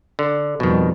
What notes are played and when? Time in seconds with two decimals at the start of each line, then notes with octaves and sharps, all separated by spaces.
0.19 D3
0.60 F2 B2 D#3 G3